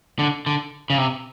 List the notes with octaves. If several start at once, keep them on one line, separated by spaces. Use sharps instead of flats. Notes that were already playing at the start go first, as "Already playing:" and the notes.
D3
D3
C#3
C3